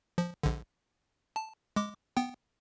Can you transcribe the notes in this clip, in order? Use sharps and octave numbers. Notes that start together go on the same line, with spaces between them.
F3
A#1 D3
A5
G#3 D6
B3 G5